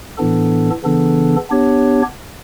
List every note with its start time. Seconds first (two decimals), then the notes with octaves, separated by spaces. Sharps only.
0.17 A2 E3 B3 D4 A4
0.83 C#3 E3 B3 D4 A4
1.50 B3 D4 G4 C#5